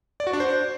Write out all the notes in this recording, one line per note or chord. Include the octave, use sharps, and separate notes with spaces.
D5
F#4
D4
C5